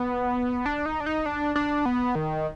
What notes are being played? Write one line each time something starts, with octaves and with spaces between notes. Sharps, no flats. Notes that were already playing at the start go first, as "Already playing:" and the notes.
Already playing: B3
D4
D#4
D4
D#4
D4
D4
B3
D#3